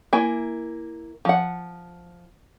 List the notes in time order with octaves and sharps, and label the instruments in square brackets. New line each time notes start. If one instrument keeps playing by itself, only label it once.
[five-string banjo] A#3 E4 G#5
F3 F#5